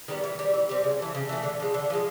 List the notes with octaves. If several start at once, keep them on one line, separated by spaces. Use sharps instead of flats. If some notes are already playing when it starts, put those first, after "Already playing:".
D#3 G3 B3
E3
G3 C4
E3
G3 C4
C#3
E3 A3
C#3
E3 A3
D3
F3 G#3
D3
F3 G#3